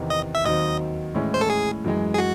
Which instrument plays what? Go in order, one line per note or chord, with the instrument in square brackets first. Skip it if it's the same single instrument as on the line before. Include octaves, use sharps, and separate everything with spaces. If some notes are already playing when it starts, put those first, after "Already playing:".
Already playing: [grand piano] E2 C3 D#3
[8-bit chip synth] D#5
E5
[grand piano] D#2 D#3 F#3 C4 D#4 [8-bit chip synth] D#5
[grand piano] A2 E3 G#3 C#4 E4
[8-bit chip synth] C5
A4
G#4
[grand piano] F#2 E3 G#3
[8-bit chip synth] G#4
F#4